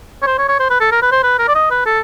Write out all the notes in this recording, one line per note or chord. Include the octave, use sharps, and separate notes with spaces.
C#5
C5
C#5
C#5
C5
B4
A4
A#4
B4
C5
B4
A#4
D5
D#5
B4
A4